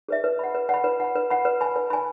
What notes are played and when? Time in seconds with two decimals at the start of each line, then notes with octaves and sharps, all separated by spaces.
0.09 G#4 B4 E5
0.24 B4
0.39 F#5 B5
0.55 B4
0.69 F#5 B5
0.84 B4
1.00 F#5 B5
1.16 B4
1.30 F#5 B5
1.45 B4
1.61 G#5 B5
1.76 B4
1.90 G#5 B5